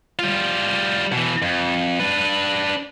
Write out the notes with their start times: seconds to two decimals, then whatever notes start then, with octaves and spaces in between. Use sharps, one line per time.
0.19 G3 F4
1.12 B2 E3
1.42 F2
1.99 D4 B4